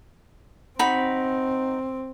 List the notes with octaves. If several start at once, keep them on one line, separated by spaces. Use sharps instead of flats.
C4 D#4 F#4 B5